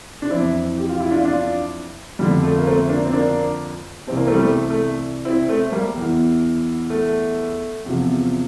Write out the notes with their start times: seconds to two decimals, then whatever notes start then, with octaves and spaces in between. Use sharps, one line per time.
0.22 D4
0.31 F2 E3 C4 E4
0.78 G4
0.89 F4
1.00 E4
1.11 D4 F4
1.24 D4 F4
2.19 F2 D3 F3 G3
2.43 A3
2.58 A#3
2.66 A3 C4
2.89 A#3 D4
3.05 C4
3.13 A#3 D4
4.07 C2 C3 E3 C4
4.17 A#3
4.27 A3 C4
4.34 G3
4.39 A3
4.70 A3
5.25 C4 E4
5.49 A3 C4
5.72 G3 A#3
5.96 E2 E3
6.90 A3
7.84 E2 C3 F3